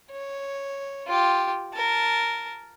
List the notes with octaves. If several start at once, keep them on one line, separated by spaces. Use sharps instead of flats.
C#5
F4 G4
A#4 A5